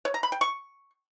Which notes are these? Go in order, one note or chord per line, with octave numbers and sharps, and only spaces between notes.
C#5
A#5
B5
G5
C#6